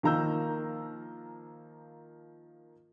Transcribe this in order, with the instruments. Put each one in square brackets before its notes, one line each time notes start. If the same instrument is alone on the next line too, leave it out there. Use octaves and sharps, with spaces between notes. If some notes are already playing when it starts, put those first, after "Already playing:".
[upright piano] D#3 F3 A#3 A#5 E6 G6